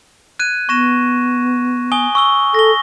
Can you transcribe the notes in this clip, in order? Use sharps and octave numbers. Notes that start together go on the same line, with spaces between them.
F#6 G#6 D#7
B3 C#6 A#6 E7
G#5 D#6 G7
C#6 E6 G7
A4 A#6 G7